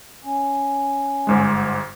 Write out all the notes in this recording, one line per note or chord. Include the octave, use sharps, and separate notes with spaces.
C#4
G1 G#2 G#3